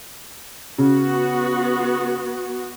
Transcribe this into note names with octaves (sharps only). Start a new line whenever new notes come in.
C#3 B3 F#4